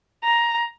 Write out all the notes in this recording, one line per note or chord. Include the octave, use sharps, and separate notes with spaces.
A#5